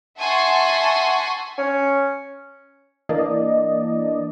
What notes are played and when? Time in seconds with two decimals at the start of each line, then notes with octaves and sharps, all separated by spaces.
0.18 E5 F#5 G#5 A5 C6 C#6
1.58 C#4
3.09 E3 A#3 D4 D5 D#5